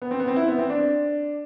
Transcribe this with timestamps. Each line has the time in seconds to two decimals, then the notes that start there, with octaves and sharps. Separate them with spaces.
0.02 B3
0.11 C4
0.20 B3
0.28 C4
0.36 E4
0.48 B3
0.59 C4
0.70 D4